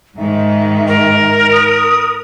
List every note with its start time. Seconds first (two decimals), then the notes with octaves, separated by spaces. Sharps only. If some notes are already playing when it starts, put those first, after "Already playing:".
0.17 G#2 D#3 E5
0.88 A#4
1.52 D#6